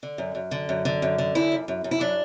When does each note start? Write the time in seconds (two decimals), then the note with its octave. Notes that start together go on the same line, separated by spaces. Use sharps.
0.03 D3
0.18 F#2
0.35 F#2
0.51 D3
0.69 F#2
0.85 D3
1.02 F#2
1.18 D3
1.35 F#2 E4
1.52 F#2
1.68 F#2
1.84 F#2
1.91 E4
2.00 F#3 D4